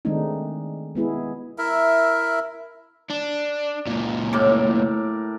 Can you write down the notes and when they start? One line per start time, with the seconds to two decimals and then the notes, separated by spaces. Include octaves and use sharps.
0.05 D#3 G#3 A3 C4 D4 D#4
0.95 G#3 B3 E4 G#4
1.58 E4 A#4 E5
3.10 D4
3.87 C#2 A#2
4.33 A2 A#4 D6